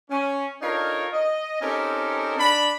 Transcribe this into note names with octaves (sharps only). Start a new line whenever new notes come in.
C#4
D4 D#4 F4 A4 A#4 C#5
D#5
C4 C#4 D#4 G4 A4 A#4
D4 B5